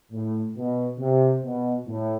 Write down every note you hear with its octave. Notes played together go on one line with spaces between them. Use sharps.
A2
B2
C3
B2
A2